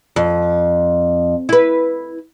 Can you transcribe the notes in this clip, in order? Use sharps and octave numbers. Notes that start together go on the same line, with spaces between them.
F2
E4 B4